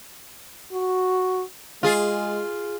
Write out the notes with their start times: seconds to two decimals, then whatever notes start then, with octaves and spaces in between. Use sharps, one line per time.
0.72 F#4
1.83 G#3 F4 G#4